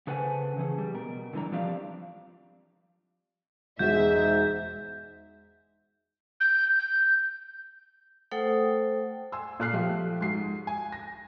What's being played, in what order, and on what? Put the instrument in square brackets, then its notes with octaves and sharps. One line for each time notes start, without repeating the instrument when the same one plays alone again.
[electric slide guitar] C#3 A4 B4 C5 F#5 G#5
C#3 E3 C#4 G#4
G3
B2 A#4
A#2 D3 E3 G3 A#5
F3 G3 C4 F4 D5 F5
[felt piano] E1 F#4 [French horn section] G#2 [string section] E5 [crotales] G6
[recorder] G6
G6
[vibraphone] A3 A4 C5 F#5 G5 D#6
[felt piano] G#5 C6 E6
A#2 A4 F6 F#6 C7
F3 A3 G4 E5
G#2 F#4 C7
G#5
A#6